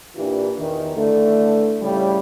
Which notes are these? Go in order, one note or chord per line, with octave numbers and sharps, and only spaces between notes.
A#2 E3 D4 F4 G4
E2 D#3
D3 E3 A3
A2 C#3 G3